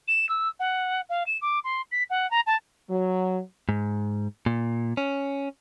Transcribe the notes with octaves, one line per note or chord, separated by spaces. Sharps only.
E7
E6
F#5
F5
E7
D6
C6
B6
F#5
A#5
A5
F#3
G#2
A#2
C#4